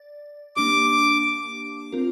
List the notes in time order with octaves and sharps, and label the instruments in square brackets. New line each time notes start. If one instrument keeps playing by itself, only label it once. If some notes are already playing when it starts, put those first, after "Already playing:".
Already playing: [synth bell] D5
[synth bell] A#3 D4 G4 [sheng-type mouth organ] D6
[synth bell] C4 F4 A#4